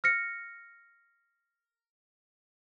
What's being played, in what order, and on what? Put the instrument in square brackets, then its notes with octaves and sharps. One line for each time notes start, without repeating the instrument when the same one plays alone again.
[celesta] F6 A#6 C#7